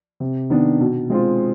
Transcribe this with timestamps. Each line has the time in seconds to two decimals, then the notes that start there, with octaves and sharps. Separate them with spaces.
0.20 C3
0.50 D#3 B3 D4
0.80 B2
1.10 G#3 C4 F4